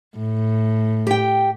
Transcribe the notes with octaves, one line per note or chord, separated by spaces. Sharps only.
A2
G4 G5